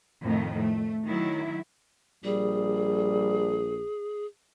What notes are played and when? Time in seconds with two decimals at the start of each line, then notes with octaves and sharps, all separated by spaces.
0.23 F2 A2 D#3 A3
0.60 A3
1.05 D#3 F#3 E4
2.25 A#1 G3 G#4